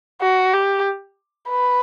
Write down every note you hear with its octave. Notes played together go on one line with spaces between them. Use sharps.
F#4
G4
B4